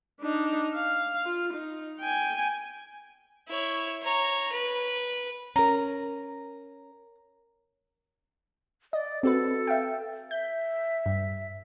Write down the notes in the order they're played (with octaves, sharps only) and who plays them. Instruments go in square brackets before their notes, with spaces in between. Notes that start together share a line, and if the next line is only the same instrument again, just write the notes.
[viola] D4 D#4
F5
F4
D#4
G5 G#5
[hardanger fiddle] E4 C#5
C#5 A#5
B4
[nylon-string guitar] C#4 A#4 [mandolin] A#5
[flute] D5 [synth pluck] D#5
[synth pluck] C4 F#4 B4 [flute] A4
[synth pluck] E5 F5 G5
[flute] E5 [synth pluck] G6
[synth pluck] G2